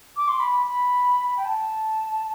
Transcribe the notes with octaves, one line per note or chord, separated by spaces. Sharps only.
D6
C6
B5
B5
G5
A5